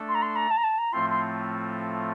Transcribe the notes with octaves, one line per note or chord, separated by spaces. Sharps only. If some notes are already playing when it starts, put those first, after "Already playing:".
Already playing: A3 D4 A4
C6
A#5
C6
A#5
A5
A#5
A5
A#5
A2 F3 A3 C4 F4 C6
C6